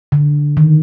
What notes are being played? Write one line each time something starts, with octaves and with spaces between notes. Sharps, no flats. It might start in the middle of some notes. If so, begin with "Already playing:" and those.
D3
D#3